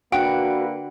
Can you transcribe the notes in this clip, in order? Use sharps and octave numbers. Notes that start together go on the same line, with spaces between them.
D3 A#3 D4 F#4 B4 F#5 G5